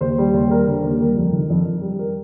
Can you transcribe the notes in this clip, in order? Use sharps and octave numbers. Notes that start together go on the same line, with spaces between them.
D#2 C5
G3
D#2
G3 A#4
D3
D#2
G3 A#4
F2
D#3
F2
F2
G3
A#4